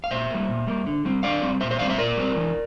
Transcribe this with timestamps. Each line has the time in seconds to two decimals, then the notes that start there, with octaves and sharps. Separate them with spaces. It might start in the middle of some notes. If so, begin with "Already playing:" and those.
0.04 F5
0.11 A#2 C5 E5
0.30 G3 A#3
0.48 A#2
0.67 G3 A#3
0.86 D3
1.05 G3 C4
1.23 D3 D5 F5
1.42 G3 C4
1.61 A#2 C5 E5
1.71 C5 E5
1.79 G3 C4 D5 F5
1.89 C5 E5
1.98 A#2 A#4 D5
2.17 G3 C4
2.36 E3